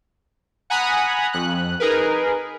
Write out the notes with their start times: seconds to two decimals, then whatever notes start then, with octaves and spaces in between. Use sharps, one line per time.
0.70 F#5 G#5 A#5 B5 D#6 F#6
1.33 F2 F#6
1.80 D#4 G#4 A#4 B4